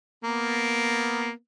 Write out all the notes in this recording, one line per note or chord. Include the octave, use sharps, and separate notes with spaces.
A#3 B3